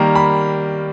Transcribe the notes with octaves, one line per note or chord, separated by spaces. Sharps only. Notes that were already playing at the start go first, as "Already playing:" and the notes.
Already playing: D#3 G3 A#3 A#5
B5